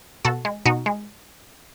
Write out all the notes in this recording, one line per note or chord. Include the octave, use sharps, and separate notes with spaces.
B2 F#4 A4
G#3
B2 D#4 F#4
G#3